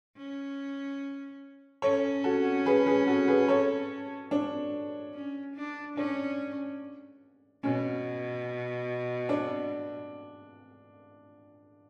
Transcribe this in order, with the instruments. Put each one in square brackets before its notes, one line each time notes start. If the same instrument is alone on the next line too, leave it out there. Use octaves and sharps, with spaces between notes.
[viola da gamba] C#4
[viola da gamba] C#4 [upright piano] A4 C#5
[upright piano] F#4 A4
G#4 B4
G#4 B4
F#4 A4
G#4 B4
A4 C#5
D4
[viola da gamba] C#4
D4
[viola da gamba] C#4 [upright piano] D4
[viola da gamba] B2 [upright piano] C#4
[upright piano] D4